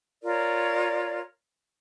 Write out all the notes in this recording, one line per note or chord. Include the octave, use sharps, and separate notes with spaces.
F4 A#4 C#5 D5